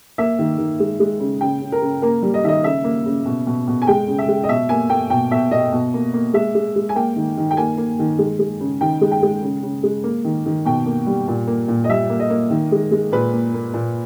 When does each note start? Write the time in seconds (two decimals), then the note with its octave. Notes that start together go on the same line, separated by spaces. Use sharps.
0.18 A#3 E5
0.39 D#3
0.58 D#3
0.80 G#3
1.00 G#3
1.20 C#3
1.41 C#3 G5
1.62 C#3
1.72 A#4
1.82 C#3
2.02 A#3 A#4
2.23 G3
2.34 D#5
2.44 D#3 E5
2.48 D#5
2.64 C#3 E5
2.84 A#3
3.06 C#3
3.26 B2
3.47 B2
3.68 B2
3.82 G#5
3.87 G#3 G5
4.08 C#3
4.18 E5
4.28 G#3
4.44 D#5
4.49 B2 E5
4.69 A#3 G#5
4.90 A#3 G5
5.10 B2 G5
5.31 B2 E5
5.51 B2 D#5
5.73 B2
5.94 A#3
6.13 A#3
6.34 G#3 E5
6.54 G#3
6.76 G#3
6.89 G#5
6.96 A#3 G5
7.16 D#3
7.37 D#3
7.51 G5
7.57 A#3 G#5
7.78 A#3
7.99 D#3
8.19 G#3
8.39 G#3
8.60 C#3
8.81 D#3 G5
9.01 G#3
9.12 G5
9.22 G#3
9.43 C#3
9.63 C#3
9.83 G#3
10.03 A#3
10.24 D#3
10.46 D#3
10.65 B2 G5
10.86 A#3
11.07 G3
11.28 A#2
11.47 A#3
11.68 A#2
11.84 D#5
11.89 G3 E5
12.10 A#3
12.20 D#5
12.30 A#3
12.50 D#3
12.72 G#3
12.91 G#3
13.12 A#2 B4
13.33 A#3
13.54 A#3
13.74 A#2